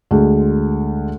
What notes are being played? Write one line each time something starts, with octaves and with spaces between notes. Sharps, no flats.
D2 G#3